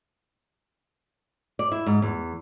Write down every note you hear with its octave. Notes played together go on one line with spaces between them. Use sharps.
D5
E4
G#2
E2